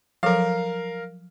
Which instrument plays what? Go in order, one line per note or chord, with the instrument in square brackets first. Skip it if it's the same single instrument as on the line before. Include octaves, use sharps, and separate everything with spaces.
[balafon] F3 F#3 A4 [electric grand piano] A#4 F5